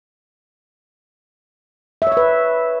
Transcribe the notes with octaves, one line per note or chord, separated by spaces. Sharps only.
E5
C#5
E5
B4